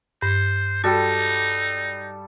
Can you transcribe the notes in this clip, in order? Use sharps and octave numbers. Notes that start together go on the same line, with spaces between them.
G2 C5
G3 D#4 F#4 A4